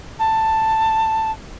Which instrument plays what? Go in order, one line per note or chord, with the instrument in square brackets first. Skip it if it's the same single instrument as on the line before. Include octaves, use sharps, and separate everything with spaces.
[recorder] A5